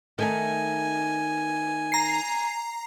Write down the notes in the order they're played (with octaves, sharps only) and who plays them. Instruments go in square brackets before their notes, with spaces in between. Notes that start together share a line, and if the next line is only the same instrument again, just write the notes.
[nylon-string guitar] D#3 A3 D#4 [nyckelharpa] G#5
[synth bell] A#5 C7